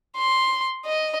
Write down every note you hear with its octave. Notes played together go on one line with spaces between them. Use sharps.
C6
D#5